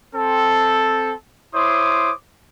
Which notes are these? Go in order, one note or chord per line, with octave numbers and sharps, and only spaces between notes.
C4 A4
E4 C5 C#5 C6 D6 D#6